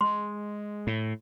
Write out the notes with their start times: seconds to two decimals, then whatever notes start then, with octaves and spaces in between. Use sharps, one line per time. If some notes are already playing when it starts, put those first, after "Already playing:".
0.01 G#3 C6
0.87 A2